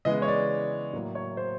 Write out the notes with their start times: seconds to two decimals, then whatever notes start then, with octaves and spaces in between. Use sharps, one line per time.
0.05 C#3 E3 G#3 B3 D#5
0.22 C#5
0.28 D5
0.93 A2 F#3 A#3
1.15 C#5
1.37 C5